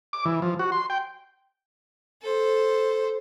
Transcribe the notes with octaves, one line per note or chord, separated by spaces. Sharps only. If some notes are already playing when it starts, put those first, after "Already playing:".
D6
E3
F3
F#4
C6
G5
A4 C5